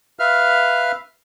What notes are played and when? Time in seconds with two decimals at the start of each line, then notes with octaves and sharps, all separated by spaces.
0.19 B4 E5 F5 F6